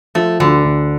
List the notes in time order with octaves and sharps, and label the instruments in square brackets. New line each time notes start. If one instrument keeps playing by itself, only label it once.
[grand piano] F3 [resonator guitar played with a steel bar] A3
[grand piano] D2 [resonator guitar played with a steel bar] D3
[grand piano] D2